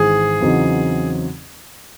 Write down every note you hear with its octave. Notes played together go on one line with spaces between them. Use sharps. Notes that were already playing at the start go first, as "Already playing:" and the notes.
Already playing: G#1 G#2 E3 G#4
E2 C#3 F#3 C4 D#4